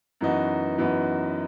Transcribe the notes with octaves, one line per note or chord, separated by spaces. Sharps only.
F#2 E3 B3 D#4 F#4
F#2 E3 B3 D#4 F#4